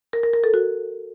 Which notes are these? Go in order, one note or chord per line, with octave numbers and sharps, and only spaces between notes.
A#4
A#4
A#4
A4
F#4